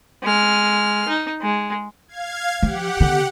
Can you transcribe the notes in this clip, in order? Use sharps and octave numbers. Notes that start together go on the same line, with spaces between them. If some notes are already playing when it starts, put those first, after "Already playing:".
G#3 F6
D#4
G#3
F5 G#6
F3 G4 F#5
D3 B3